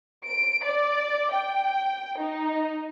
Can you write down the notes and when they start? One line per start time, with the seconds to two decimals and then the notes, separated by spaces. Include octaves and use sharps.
0.26 D7
0.64 D5
1.33 G5
2.19 D#4